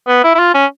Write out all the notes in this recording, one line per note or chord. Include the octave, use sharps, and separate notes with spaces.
B3
E4
E4
F4
C#4